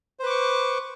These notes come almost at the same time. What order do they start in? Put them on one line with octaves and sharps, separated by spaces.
C5 B4 D6 C#6